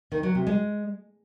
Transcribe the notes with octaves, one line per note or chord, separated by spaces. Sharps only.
D#3
F#3
C3
G#3